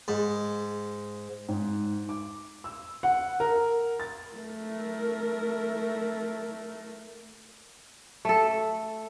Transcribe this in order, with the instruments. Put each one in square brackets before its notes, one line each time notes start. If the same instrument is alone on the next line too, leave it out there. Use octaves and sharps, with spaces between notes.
[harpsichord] G#2
[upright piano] G#2
D6
E6
F#5
A#4
A6
[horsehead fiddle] A3 A#4
[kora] A3 A4